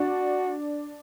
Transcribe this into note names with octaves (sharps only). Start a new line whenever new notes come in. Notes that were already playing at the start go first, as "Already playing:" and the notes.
Already playing: D4 F#4